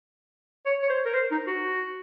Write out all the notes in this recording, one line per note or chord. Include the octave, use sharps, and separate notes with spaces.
C#5
C#5
C5
A#4
C5
D#4
F#4